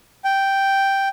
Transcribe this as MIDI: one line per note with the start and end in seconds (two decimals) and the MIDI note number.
0.24 1.08 79